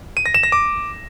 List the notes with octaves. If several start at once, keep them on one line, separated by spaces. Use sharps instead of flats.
D#7
A#6
E7
A#6
D6